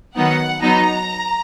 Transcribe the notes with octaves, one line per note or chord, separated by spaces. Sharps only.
D#3 F#3 B3 D#4 F#5
F#3 B3 D#4 A#5